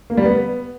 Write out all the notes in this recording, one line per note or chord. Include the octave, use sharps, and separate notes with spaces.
A#3
G3
B3